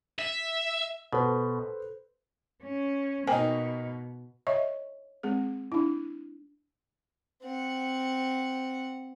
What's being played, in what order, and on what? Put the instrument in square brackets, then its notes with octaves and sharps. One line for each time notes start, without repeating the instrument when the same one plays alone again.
[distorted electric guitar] E5
[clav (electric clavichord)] B2 [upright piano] A4 B4 C5
[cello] C#4
[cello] B2 [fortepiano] A#3 D#4 [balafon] C5 G5 G#5
[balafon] C#5 D#5 E5 C#6
G#3 C4 G#4
D4 E4
[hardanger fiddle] C4 F#5